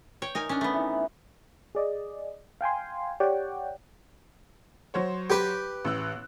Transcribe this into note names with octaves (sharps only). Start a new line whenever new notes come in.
C#5 G5
D#3 D#4 A#4 G#5
C#4 D4
A3 B3 D#4
E3 D#4
G#4 D5 D#5
F5 G5 G#5 C6
G4 C#5 D5 F#5 G5
F#3 C5 C#5
G4 B4
A1 E6 F#6